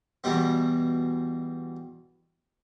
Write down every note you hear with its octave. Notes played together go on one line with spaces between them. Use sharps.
E2 B2 G3 B3